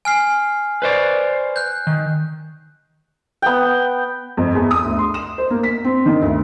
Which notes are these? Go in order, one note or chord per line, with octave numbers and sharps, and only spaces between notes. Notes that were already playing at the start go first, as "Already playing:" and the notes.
G#5 F6 C7
B4 C5 D5
F#6 G6
D#3
B3 G5
F2
E2
D#6
D2
C6
E7
C5
A#3
B6
C4
D#3
D2